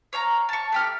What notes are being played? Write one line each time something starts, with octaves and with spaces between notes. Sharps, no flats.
C#5 F5 A5 A#5
A5 C#6
A3 G4 F6